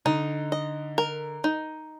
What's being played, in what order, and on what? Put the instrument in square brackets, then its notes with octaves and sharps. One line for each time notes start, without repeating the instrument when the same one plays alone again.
[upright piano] D3 [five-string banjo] D#4
[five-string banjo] D#5
A#4
D#4